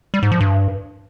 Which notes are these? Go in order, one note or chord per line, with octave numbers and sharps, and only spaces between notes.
G3
G#2
F3
G2